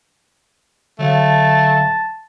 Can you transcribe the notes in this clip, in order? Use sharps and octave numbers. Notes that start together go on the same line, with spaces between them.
D3 F#3 A3 F5 A5